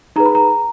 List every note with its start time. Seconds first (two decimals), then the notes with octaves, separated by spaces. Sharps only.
0.16 D#4 G#4 B4 A#5
0.26 B5
0.35 A#5